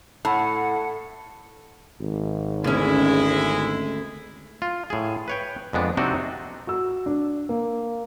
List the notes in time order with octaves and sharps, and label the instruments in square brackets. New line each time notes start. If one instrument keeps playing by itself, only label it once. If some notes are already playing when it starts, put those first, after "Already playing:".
[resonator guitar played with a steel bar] A2 [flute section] F#5 [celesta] A5 B5
[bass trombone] G#1
[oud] D2 C#4 [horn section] G#3 E4
[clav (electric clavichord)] F4
A2 G#4
B4 C#5 G5
F2 G#3 B3 D4
C3 C4 D4 D#4 F#4
[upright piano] F#4 E6
D4
A#3